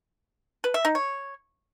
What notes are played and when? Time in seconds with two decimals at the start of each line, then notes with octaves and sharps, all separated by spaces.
0.64 B4
0.74 E5
0.85 D#4
0.95 C#5